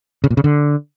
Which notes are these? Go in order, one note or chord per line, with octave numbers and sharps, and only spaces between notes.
C#3
A#2
C#3
D3